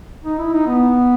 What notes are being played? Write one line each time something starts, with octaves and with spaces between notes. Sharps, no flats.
D#4
E4
D#4
B3